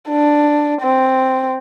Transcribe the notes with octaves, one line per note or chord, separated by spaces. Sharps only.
D4
C4